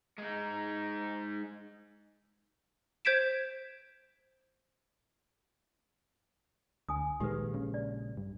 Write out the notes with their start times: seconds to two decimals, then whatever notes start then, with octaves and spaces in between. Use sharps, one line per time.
0.18 G#3 D#4
3.05 C5 G6 G#6 B6 D7 E7
6.89 D2 G#5 D#6
7.20 A#1 D#3 G#3 G4 A4 B4
7.54 C#3
7.74 D5
8.17 G2